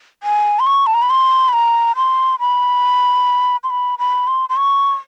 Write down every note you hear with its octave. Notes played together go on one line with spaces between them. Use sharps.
G#5
C6
C#6
A5
A#5
B5
C6
B5
A#5
C6
B5
C6
B5
B5
C6
C6
C#6